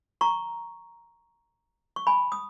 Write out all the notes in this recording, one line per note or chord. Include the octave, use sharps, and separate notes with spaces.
A#5 C#6
C#6
G#5 B5
D#6